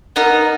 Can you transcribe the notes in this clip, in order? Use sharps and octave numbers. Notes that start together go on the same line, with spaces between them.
B3 D#4 A#4